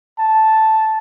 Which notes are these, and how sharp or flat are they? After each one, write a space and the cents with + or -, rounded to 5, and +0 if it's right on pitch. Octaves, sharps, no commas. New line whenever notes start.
A5 -5